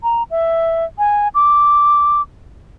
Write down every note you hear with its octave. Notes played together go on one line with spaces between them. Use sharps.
A#5
E5
G#5
D6